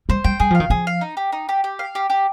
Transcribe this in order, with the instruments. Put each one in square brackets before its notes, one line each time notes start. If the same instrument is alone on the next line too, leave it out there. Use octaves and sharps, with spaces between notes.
[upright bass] G3 [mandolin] C5
[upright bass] G3 [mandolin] G5
[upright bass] G3 [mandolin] G#4
[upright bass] F3 [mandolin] F5
[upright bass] D#3
[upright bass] F3 [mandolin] G#4
[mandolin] F5
D#4
G4
D#4
G4
G4
F5
G4
G4